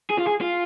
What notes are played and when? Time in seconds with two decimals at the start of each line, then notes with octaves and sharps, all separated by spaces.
0.10 G#4
0.18 F4
0.27 G#4
0.41 F4